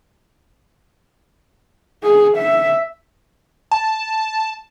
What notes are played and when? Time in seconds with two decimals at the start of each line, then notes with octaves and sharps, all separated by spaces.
2.03 G#4
2.38 E5
3.71 A5